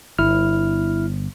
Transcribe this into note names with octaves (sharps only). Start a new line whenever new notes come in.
G1 E4 F6